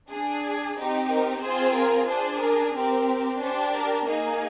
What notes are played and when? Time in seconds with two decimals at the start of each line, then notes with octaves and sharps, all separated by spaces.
0.10 D4 G#4
0.77 C4 D#4 G4
1.09 A#4
1.42 C4 F4 G#4 C5
1.74 A#4
2.08 D4 G#4 C5
2.40 A#4
2.73 C4 G4 A#4
3.39 D4 G4 C5
3.72 A#4
4.05 A#3 D#4 G#4